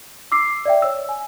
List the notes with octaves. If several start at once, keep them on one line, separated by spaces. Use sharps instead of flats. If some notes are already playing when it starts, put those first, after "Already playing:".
D6 E6 C7
D5 E5 G5
C#5 E6
G#5